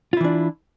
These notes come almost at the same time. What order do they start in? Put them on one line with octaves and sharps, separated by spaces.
F4 E4 E3 D4